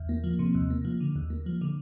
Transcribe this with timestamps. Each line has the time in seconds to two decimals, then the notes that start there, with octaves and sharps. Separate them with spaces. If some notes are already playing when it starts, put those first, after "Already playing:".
Already playing: E2
0.09 A#3
0.24 F3
0.39 C3
0.55 D#2
0.70 A#3
0.85 F3
1.00 D3
1.16 D#2
1.30 A#3
1.46 F3
1.61 D3